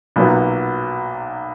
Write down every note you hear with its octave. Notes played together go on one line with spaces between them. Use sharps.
B1 A#2 F#3 B3